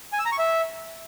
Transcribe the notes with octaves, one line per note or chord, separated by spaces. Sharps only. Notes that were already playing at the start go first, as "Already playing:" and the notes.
G#5
E6
A#5
C#6
E5